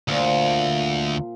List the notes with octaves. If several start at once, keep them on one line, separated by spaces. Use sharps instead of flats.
D2 A#2 C5